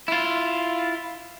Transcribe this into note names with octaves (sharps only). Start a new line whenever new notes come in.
E4 F4